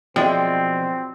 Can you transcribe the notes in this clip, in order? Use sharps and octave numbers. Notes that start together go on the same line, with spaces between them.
B2 F3 F#3 G#3 C4 E4 D5 G5